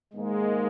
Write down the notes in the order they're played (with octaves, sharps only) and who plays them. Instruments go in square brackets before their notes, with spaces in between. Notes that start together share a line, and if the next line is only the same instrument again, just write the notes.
[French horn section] G#2 D#3 A#3 D#4 [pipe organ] G#3